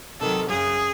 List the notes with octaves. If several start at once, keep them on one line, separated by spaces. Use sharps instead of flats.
C3 D#3 F#3 A4
F#2 C#3 F#3 G#4